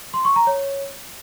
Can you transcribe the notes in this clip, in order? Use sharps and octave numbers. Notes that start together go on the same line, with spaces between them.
C6
C#6
A#5
C#5